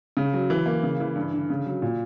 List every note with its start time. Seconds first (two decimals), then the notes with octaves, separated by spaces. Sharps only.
0.17 C#3
0.33 F#3
0.50 E3
0.66 A#3
0.83 C#3
1.00 E3
1.16 G2
1.33 D3
1.50 C#3
1.66 F#3
1.82 A#2